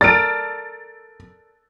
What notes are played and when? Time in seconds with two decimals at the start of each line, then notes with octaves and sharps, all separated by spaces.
0.01 A4 A#4 D5 A6 D7